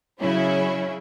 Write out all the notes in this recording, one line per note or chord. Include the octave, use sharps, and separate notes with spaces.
C#3 F#3 C#4 E4